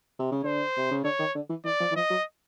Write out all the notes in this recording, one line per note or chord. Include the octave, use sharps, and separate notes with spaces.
C3
C#3
D3 C5
C3
C#3
D3 C#5
D#3
D3
E3
E3 D5
F3
E3
F3 D#5
F#3